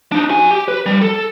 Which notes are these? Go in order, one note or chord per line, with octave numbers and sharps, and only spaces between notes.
D4 D#4
F#4 G#5
G4
B4
G3
A4